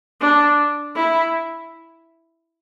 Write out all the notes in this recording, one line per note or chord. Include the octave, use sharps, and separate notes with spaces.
D4
E4